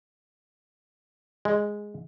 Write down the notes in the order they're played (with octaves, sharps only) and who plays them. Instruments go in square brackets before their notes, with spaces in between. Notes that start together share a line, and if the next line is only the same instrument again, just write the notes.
[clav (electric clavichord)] G#3